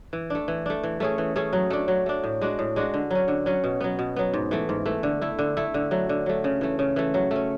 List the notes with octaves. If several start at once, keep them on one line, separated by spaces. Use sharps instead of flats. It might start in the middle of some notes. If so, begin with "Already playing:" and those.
E3
A3 D4
E3
A3 D4
E3
A3 C#4 G#4
E3
A3 C#4 G#4
F#3
A3 D4
F#3
A3 D4
A2
G#3 D4 F#4
A2
G#3 D4 F#4
D3
F#3 C#4
D3
F#3 C#4
B2
F#3 B3
B2
F#3 B3
G#2
E3 A3
G#2
E3 A3
D3
A3 E4
D3
A3 E4
D3
F#3 A3
D3
F#3 A3
C#3
E3 A3
C#3
E3 A3
F#3
A3 C#4